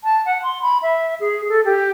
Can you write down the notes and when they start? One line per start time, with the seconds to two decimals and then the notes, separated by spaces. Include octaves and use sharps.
0.04 A5
0.26 F#5
0.43 C6
0.62 B5
0.82 E5
1.20 G#4
1.49 A4
1.65 G4